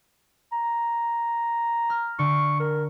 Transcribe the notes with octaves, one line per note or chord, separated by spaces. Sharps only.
A#5
F6
D3 C#6
A#4